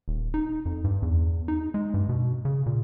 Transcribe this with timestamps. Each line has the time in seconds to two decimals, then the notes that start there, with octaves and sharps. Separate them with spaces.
0.08 D#1
0.34 D#4
0.65 F2
0.84 G2
1.02 E2
1.48 D#4
1.74 G#3
1.94 G2
2.09 B2
2.45 C#3
2.66 A#2